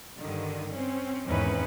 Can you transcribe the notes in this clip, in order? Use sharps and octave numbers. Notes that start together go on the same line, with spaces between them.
G2 D3 D#3
C4 C#4
E2 G#2 D#3 C4 C#4 B4